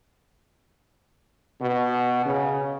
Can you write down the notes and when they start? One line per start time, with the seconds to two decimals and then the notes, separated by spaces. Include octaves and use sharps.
1.61 B2
2.25 C#3